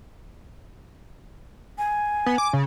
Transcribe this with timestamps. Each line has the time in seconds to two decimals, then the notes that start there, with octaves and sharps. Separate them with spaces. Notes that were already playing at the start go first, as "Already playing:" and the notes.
1.78 G#5
2.26 B3
2.38 D6
2.53 C#3